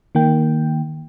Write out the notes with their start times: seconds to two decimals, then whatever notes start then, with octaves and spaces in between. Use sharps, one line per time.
0.15 D#3 A#3 G5